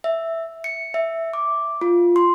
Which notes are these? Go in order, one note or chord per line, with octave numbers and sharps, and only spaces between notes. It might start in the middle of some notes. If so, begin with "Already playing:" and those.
E5
C#7
E5
D6
F4
C6